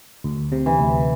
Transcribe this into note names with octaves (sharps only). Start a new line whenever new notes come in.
D2
C3
E3
D2